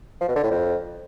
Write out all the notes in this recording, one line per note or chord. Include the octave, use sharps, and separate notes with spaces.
F3
B2
D3
A2
F2